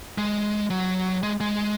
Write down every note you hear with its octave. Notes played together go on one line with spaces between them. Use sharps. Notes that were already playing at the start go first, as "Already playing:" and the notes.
G#3
F#3
G#3
G#3